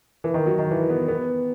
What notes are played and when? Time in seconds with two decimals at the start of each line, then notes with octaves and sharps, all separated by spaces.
0.24 E3
0.34 D#3
0.46 F#3
0.59 D#3
0.71 E3
0.90 B3
1.08 B3